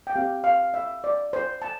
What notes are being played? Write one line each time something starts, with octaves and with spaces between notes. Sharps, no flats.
G5
C4 G4 F5
F5
E5
D5
C5
A5